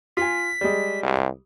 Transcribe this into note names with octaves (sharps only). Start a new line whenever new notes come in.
F4 G#5 B6
G3 G#3
C2